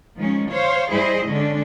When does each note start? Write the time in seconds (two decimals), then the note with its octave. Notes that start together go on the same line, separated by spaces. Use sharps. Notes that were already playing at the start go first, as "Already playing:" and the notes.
0.18 D#3 F3 G#3 C#4
0.51 C5 C#5 F5
0.92 G3 E4 G#4 C5 D#5
1.29 D3 G#3 C#4 D4